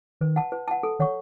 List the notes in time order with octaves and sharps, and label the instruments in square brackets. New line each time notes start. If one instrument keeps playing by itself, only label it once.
[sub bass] D#3 [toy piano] B4
[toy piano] F#5 A5
B4
F#5 A5
A4
[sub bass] D#3 [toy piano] C#5 F#5 C#6